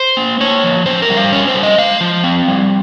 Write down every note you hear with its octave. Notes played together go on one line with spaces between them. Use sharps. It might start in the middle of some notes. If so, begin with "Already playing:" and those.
Already playing: C5
A#3
A#3 C#5
F3
C#4 C5
A#4
G3
F5
C#4 C#5
C5
G3
D#5
G#3 F5
F3
C4
G3